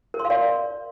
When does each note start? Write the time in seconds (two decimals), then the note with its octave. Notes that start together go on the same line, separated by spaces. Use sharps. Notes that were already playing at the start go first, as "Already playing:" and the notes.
0.14 A#4
0.19 C6
0.25 F5
0.30 D5